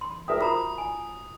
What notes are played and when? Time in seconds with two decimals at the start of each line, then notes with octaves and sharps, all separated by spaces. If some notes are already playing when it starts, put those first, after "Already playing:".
0.01 C6
0.28 A#4 E5 G5 D#6
0.41 F4 F#4 C5 A#5 D#6
0.78 G#5